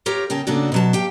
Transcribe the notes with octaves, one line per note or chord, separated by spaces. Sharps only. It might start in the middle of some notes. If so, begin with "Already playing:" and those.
F4 G4 A#4 C#5
C#3 A#4 G5 A5
C#3 A3 A#3 D4 F#4 D5
B2 F#3 A5
G4 F5 G5